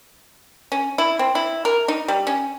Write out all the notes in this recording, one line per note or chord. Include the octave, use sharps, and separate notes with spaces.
C#4
E4
C4
E4
A#4
D#4
G3
C#4